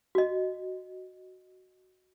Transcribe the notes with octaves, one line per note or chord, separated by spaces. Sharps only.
F#4 D#5